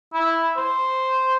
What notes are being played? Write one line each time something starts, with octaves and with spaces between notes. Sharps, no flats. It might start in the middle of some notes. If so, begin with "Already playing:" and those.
E4
C5